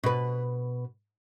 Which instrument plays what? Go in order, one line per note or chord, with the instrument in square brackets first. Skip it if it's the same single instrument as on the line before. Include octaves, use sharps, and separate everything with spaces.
[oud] B2 B4